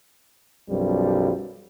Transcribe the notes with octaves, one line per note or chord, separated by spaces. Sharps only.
B1 F#2 F3 G3